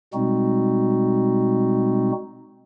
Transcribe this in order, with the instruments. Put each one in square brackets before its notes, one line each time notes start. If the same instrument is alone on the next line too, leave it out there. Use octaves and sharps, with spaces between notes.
[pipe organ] B2 G3 G#3 C4 D#4 F#4